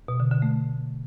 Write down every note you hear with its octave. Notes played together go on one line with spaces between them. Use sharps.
B2
D3
D3
A3